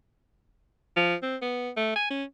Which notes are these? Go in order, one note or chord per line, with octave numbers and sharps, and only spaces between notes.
F3
C4
B3
A3
G#5
C#4